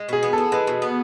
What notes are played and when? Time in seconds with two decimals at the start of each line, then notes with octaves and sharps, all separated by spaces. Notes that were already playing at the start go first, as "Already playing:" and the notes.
Already playing: G#3
0.09 B2 G#4
0.23 B3
0.33 A4
0.38 E4
0.52 G#3 B4
0.67 B2
0.82 B3